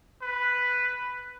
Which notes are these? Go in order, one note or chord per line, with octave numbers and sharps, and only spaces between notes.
B4